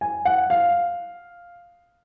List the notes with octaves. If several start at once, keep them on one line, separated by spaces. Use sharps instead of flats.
G#5
F#5
F5